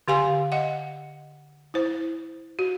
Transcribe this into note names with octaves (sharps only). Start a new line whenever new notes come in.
D3 G4 F5 G#5 C6
D#5 F#5
E4 C5
F#4